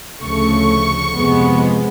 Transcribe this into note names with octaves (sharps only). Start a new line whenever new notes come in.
D2 C#3 F3 A3 C#6
F2 C3 F3 G#3 B3